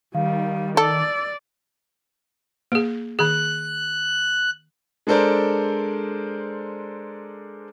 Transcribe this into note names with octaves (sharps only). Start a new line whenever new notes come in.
D#3 G3 F5
A4 D5 E6
A#3 G#4
D#3 G#4 F#6
G#3 D4 A4 A#4 C5 D5